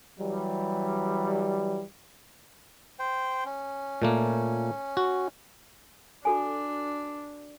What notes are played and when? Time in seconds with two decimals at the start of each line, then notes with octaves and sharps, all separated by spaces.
0.19 E3 F#3 G3
2.99 C5 G5
3.45 C#4
4.02 A#2 A3 A#3
4.97 F#4
6.25 D4 F#4 A4 G#5